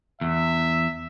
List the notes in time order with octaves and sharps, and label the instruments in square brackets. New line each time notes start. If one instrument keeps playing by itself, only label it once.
[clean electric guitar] E2 [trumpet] E5